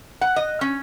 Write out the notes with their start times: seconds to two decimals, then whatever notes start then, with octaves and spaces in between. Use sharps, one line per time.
0.21 F#5
0.36 D#5
0.61 C#4